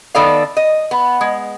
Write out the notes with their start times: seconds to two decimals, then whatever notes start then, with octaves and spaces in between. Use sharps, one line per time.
0.15 D#3 B3 A4 D5 F5
0.57 D#5
0.91 B3
1.21 G#3